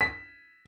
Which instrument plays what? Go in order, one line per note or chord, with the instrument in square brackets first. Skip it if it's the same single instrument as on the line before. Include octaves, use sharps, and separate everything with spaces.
[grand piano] B6